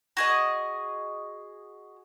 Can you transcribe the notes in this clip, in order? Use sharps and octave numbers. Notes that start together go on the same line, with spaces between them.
F#4 G#4 D#5